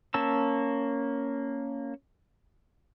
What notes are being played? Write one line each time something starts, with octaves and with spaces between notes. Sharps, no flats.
A#3 C#4 A5 E6